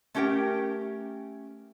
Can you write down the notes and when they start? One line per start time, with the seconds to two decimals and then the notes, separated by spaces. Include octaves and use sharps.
0.15 A3 C#4 G4 A#4 G5